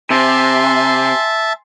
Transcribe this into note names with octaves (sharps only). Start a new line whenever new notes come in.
C3 E5 G#5 A5 C6